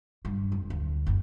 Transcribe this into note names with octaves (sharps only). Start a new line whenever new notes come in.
G2
F1
D2
F#1